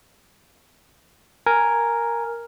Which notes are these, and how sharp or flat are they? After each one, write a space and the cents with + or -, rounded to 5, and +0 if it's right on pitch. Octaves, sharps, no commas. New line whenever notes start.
A#4 +0 G#5 +0